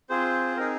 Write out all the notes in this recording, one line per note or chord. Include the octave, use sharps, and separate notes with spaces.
C4 F4 G#4 C5
C4 D#4 G#4 A#4